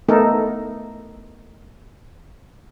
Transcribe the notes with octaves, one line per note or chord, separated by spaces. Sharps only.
A3 B3 D#4 A4 A#4